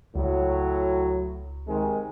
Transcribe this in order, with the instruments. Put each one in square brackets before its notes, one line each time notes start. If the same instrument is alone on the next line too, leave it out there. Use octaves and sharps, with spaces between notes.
[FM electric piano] C#2 [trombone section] A2 F#3
[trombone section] C3 D#3 G#3